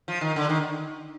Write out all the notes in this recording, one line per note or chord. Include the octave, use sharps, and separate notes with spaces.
F3
D#3
D3
D#3